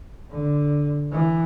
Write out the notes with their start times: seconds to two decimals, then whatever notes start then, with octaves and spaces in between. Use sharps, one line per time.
0.30 D3
1.12 E3